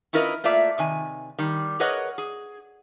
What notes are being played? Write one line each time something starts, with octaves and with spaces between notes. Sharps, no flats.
C#4 E4 F4 A#4 B4 D#5
A3 A#3 F4 D5 E5
C3 D#3 G#5
D#3 G3
G#4 A#4 B4 C#5 D#5 F#5
G#4